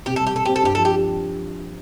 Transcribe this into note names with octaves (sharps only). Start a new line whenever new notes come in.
C3 G4
G3 A4
G4
C3 A4
C4 G4
A4
G2 G4
F3 A4
G4